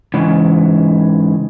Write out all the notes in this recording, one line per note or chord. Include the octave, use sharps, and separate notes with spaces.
G#2 C#3 E3